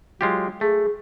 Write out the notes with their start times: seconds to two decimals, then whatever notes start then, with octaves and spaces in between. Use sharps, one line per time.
0.21 F#3 G#3 F4 G4
0.61 A3 G#4